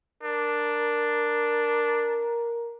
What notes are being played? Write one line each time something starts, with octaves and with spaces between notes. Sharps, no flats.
D4 A#4